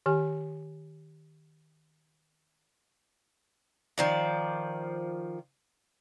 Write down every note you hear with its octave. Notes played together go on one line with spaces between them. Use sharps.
D#3 G4 G#5
D#3 F3 D5